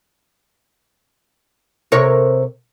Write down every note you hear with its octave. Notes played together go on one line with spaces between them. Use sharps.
C3 A#4 C#5